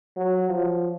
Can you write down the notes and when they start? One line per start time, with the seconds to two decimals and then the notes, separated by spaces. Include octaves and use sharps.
0.17 F#3
0.49 F3